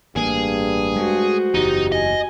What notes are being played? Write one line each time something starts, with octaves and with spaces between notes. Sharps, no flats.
A1 G2 A#3 G#4
G#3 A3 F#4 C5
F#1 E2 D#4 G4
D#5 G#5